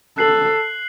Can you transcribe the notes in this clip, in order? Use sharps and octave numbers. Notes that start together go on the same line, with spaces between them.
A4 F#6 C7 F#7